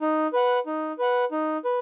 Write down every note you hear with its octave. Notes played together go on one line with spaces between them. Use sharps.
D#4
B4 F#5
D#4
B4 F#5
D#4
B4